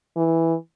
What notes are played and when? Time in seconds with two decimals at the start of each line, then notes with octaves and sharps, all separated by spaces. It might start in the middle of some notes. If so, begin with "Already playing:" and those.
0.17 E3